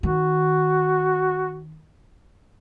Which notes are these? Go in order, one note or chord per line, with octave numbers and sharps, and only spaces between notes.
D#3 F#4